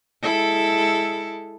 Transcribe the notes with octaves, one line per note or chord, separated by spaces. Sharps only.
G#3 E4 A4